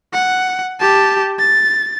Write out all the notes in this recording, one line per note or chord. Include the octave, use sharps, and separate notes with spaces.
F#5
G4 A5
A6